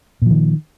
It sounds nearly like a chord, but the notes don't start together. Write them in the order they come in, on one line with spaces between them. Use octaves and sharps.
A#2 F3 D#3